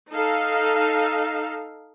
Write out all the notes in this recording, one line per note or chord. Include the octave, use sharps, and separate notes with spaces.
D#4 A4 F5